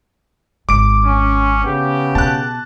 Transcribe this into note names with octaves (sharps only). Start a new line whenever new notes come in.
G#1 D6 D7
C#4
C#3 B3 G4
B2 A5 F#6